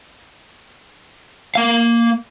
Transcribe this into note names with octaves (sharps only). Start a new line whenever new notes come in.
A#3 F5